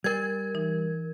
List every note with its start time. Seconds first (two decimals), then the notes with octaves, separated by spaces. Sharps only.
0.04 G3 A#4 G#6
0.55 E3 D#4